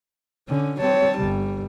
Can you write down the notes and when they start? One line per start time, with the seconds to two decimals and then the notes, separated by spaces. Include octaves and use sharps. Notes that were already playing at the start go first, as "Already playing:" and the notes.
0.49 D3 C#4
0.80 G3 C4 C#5 A5
1.19 G1 G3